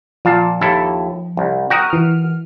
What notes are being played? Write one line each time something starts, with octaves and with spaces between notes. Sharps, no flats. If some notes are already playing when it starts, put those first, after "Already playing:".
A#2 F3 F5 A5
D#2 E4 A4
C2
F#4 A#4 G5 D#6
E3 F6